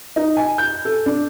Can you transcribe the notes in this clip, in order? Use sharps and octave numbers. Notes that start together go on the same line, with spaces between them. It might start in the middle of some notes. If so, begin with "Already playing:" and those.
D#4
G#5
G6
A4
D4